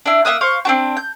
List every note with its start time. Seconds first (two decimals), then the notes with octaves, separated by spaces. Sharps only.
0.06 D4 E4
0.25 A#3 E5 D#6 F#6
0.41 C5 F5 C#6
0.65 C4 D4 F#4
0.97 G6